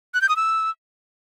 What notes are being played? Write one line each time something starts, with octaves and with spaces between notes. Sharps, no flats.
F#6
G6
D#6
E6